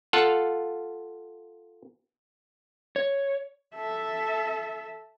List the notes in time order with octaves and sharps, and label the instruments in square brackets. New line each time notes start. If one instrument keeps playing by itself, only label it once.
[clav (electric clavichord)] F4 A4 F5 F#5
[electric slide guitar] C#5
[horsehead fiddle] A4 E5